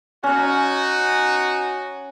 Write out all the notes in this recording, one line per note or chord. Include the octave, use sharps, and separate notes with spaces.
C#4 D#4 F#4